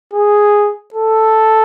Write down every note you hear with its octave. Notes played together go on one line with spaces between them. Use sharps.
G#4
A4